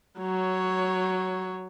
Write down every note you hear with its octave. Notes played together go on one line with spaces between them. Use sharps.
F#3 C#5